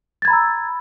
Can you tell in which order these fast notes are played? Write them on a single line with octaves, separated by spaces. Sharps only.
A6 G#6 B5 A#5 E6